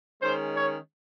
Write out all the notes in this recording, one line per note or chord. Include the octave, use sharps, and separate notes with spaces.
D#3 G#3 C#4 C5
C#5